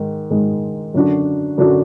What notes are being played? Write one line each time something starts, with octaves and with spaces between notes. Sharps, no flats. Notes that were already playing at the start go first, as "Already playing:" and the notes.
Already playing: G#2 D#3 G#3
G#2 D#3 G#3
F#2 D3 F#3 D4 F#4
F#2 D3 F#3 D4 F#4